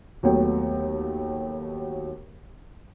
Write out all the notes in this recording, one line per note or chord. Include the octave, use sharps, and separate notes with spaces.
D#2 F#3 A3 B3 C#5 G5